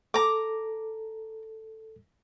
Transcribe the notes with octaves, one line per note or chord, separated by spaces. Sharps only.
A4 A#5 D6